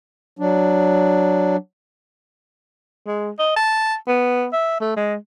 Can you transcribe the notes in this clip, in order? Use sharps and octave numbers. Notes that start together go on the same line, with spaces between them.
F#3 D4
G#3
D#5
A5
B3
E5
A3
G#3